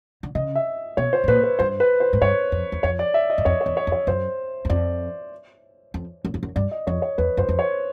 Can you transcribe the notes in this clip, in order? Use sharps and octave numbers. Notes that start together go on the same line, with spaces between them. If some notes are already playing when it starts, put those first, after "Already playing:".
D3
C#3 D#5
E5
B2 C#5
C5
A2
A#2 B4
B4
G2 C5
B4
C5
G#2
G2 C#5
F2
E2
F2 C#5
D5
E5
D#5
F#2
F2 C#5
C#5
E2
C#5
F2
C#5
F#2 C5
E2
F2 D5
F2
F#2
F2
F#2
G2 D5
D#5
F2 C#5
C#5
E2 B4
F#2 C5
F2
C#5